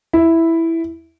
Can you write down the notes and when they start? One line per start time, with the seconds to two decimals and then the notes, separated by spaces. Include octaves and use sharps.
0.13 E4